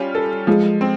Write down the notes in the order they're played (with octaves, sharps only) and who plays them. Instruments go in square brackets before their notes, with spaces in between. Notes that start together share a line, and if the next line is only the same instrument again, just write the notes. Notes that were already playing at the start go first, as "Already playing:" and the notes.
Already playing: [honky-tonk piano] G3 C#4 F4
A4
[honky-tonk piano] F3 [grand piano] G#3
[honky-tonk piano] C4